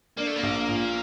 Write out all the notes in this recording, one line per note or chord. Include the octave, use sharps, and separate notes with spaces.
A#3 D4
A3
A#3
A#1
A#2